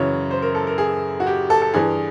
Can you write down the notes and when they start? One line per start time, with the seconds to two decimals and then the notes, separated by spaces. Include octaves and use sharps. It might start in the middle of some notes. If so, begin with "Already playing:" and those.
Already playing: F#2 C#3 E3 C#5
0.31 C5
0.42 A#4
0.55 A4
0.67 A#4
0.78 G#4
1.20 F#4
1.27 G4
1.50 A4
1.62 A4
1.74 G2 E3 G#4